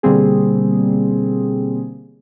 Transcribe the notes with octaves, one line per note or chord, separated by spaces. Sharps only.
B2 D3 G3 A#3 C4 G#4